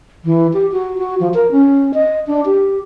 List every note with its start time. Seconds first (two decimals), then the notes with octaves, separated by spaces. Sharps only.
0.25 E3
0.53 G4
0.72 F#4
0.98 F#4
1.20 F3
1.34 A#4
1.51 C#4
1.94 D#5
2.27 D4
2.45 G4